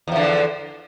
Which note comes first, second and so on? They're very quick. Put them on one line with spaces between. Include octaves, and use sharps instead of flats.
E2 F3 D3